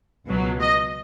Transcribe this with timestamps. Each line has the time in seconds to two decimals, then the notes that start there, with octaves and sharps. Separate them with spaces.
0.26 C#2 B2 F#3
0.60 D#5